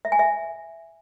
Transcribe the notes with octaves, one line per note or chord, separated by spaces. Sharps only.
E5
G#5
E5